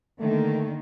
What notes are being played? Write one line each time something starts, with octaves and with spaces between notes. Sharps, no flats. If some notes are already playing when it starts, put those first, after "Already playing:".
D3 D#3 A3 A#3